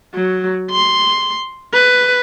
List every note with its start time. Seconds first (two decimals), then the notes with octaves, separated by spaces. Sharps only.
0.14 F#3
0.71 C6
1.73 B4